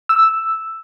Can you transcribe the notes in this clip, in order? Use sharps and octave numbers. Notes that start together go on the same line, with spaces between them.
E6